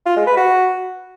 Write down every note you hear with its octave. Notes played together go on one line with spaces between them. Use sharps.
F4
G#3
B4
F#4